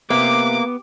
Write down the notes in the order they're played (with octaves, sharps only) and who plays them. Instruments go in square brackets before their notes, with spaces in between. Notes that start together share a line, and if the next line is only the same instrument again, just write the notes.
[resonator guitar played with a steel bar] C3 [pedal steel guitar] A#3 [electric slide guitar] B3 [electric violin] D6